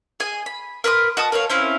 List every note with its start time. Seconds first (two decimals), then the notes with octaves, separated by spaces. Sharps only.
0.20 G#4 D#5 G#5
0.46 B5
0.84 A#4 B4 C6 D#6
1.17 F#4 D#5 A5 D#6
1.32 A#4 B4 C#5 F5
1.50 C4 C#4 E4 F5